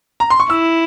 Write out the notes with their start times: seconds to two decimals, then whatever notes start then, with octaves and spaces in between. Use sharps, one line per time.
0.20 A#5
0.30 C6
0.40 C#6
0.50 E4 E6